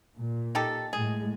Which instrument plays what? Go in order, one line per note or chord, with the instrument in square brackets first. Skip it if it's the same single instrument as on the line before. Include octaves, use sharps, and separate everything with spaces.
[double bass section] A#2
[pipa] D#4 G4 A4
[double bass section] A2 G#3 [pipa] G#4